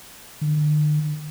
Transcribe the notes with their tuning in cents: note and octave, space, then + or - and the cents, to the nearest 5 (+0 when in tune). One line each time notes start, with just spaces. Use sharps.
D3 +40